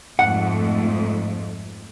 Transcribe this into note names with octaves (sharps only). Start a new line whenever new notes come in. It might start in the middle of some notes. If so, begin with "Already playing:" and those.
F2 G#2 A3 F#5